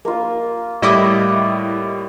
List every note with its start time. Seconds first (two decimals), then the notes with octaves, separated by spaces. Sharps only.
0.05 A#3 F4
0.82 A2 G3 E4 D#5 D6